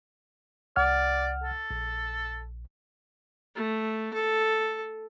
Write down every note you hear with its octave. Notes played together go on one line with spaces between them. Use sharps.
C2 D5 F#5 F6
A4
A#1
A3
A4